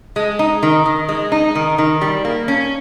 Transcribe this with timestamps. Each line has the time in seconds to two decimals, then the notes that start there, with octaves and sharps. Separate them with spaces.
0.16 G#3
0.39 D#4
0.63 D#3
0.86 D#3
1.09 G#3
1.32 D#4
1.55 D#3
1.78 D#3
2.01 G3
2.25 A#3
2.48 C#4